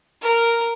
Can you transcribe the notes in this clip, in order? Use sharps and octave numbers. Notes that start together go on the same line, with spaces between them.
A#4